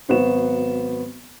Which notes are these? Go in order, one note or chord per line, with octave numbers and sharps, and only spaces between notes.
G#1 F#3 B3 F#4 C5 E7